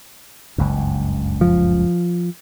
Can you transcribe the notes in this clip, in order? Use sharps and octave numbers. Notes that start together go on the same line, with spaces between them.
F#1 C#2 G2
F3